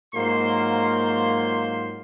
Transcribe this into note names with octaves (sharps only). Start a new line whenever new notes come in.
G#2 F#3 A#3 F4 C5 C6